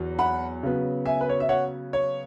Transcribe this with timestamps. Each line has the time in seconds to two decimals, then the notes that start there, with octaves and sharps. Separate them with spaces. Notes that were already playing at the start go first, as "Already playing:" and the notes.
Already playing: E2 F#3
0.19 F#5 B5
0.63 C#3 F#3 B3
1.05 E5 G#5
1.21 B4
1.29 C#5
1.40 E5
1.49 C#5 F#5
1.93 C#5